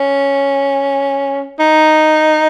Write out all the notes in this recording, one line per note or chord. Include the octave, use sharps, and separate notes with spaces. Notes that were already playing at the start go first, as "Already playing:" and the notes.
Already playing: C#4
D#4